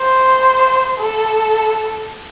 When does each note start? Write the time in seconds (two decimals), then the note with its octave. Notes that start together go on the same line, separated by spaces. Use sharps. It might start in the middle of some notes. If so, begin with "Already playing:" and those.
Already playing: C5
0.99 A4